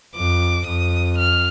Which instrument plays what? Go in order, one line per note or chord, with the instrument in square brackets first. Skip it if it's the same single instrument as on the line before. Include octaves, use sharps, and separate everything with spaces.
[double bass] F2 [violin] D6
[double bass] F2 [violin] D#6
[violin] F6